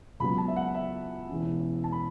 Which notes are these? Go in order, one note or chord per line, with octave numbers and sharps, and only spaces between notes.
C#2 C#3 F#3 B3 B5
A5
E5
F#5
E5
E1 E2 E3 C#4
A5
B5